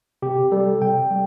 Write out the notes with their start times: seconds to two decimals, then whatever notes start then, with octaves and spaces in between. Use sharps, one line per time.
0.22 C3 G4
0.52 G3 A4
0.81 C3 G5
1.11 G3